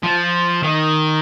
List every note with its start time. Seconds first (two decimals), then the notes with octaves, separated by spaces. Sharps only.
0.03 F3
0.63 D#3